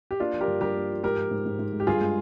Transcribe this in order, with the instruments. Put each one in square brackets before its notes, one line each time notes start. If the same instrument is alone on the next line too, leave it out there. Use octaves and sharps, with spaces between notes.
[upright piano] G4
[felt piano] A#3 [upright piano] D4 F4
[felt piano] F3
[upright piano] G4 A#4
[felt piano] G2
[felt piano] G2 [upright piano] G4 A#4
[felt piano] A#3
F3
[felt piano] G#2 [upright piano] G4 A#4
[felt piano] F3
G#2
G#2
G#2
G#3
[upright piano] G4
[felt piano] G2 [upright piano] F4 G#4
[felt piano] G#3